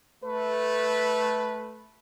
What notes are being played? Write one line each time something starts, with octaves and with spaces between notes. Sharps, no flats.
A3 B4